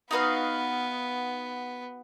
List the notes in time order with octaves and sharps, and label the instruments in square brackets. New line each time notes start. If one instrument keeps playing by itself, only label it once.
[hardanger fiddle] B3 [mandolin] D#4 F#4 B4 F5